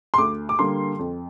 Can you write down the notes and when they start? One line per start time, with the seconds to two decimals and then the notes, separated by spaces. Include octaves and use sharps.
0.14 C6
0.18 D2 D6
0.49 D6
0.59 D3 G3 A#3 C6
0.99 F2